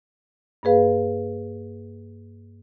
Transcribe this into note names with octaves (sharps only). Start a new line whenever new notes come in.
G2 A#3 G#4 B4 F5